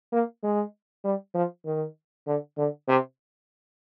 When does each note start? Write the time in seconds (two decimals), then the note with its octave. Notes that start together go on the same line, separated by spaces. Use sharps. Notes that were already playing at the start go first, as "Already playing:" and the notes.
0.12 A#3
0.43 G#3
1.04 G3
1.35 F3
1.66 D#3
2.27 D3
2.58 D3
2.88 C3